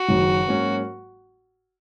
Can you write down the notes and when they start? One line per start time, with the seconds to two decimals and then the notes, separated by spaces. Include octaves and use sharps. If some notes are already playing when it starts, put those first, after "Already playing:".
Already playing: F#4
0.09 F#1 F#2 D#3 F#3
0.48 G#2 F#3 A#3 C#4